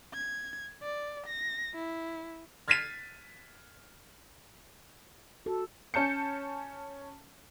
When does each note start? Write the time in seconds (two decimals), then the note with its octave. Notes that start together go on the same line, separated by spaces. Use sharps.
0.14 G#6
0.83 D5
1.27 A#6
1.75 E4
2.68 F6 G#6 A6 B6 C7 D#7
5.46 F#4 A4
5.94 C#4 A5 G6 C#7